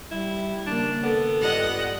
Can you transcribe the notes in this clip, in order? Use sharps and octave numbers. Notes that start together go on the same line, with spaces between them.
G3 E4
D#2 C#3 A#3 D4
B3 A4
G2 G3 F4 D#5 F#5